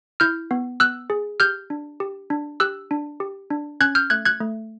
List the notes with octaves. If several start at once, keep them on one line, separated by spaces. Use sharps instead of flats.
E4 F6 G6
B3
B3 E6 F#6
G#4
G4 F6 G6
D4
G4
D4
G4 E6 F#6
D4
G4
D4
C#4 F#6 G#6
F6 G6
A3 F#6 G#6
F#6 G#6
A3